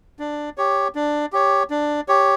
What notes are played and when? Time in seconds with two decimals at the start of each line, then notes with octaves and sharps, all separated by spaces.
0.19 D4
0.58 G4 C#5
0.95 D4
1.33 G4 C#5
1.70 D4
2.08 G4 C#5